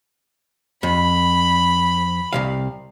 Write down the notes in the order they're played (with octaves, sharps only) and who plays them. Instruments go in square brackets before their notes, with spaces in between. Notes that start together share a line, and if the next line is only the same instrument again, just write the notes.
[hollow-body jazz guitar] F2 [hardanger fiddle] B5
[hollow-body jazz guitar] C2 E3 F5